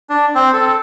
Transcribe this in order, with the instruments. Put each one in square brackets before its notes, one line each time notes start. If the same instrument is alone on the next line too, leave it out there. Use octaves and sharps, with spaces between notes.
[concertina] D4
C4
A4